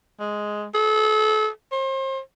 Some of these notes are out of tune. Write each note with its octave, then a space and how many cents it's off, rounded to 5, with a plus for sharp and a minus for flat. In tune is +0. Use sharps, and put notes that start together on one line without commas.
G#3 +5
A4 -35
C5 +35